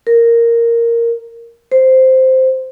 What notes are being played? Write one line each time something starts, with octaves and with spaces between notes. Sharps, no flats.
A#4
C5